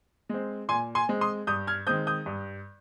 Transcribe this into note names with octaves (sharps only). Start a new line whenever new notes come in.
G#3 C4
A#2 G#5 C6
G#5 C6
G#3 C4
C6 D#6
G2 D#6 G6
F6 G#6
D#3 G#3 C4 D#6 G6
D#6 G6
G2